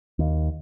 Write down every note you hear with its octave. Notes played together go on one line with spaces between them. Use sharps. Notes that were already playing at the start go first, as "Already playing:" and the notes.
D#2